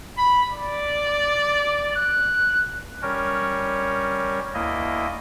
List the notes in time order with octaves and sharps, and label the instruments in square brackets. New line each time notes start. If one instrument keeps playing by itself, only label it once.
[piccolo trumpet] B5
D5
F#6
[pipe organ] G3 C#4 A#4 C#5
D2 A#3 E4 D#5